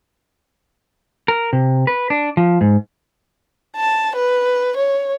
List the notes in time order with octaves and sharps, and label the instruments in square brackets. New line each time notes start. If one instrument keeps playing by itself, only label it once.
[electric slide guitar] A#4
C3
B4
D4
F3
G#2
[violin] A5
B4
C#5